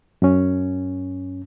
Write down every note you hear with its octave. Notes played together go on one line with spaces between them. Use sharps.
F#2 C#4